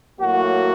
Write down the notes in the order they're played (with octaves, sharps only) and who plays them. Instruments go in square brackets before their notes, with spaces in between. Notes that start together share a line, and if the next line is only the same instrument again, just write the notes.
[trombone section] A2 F#3 A#3 F#4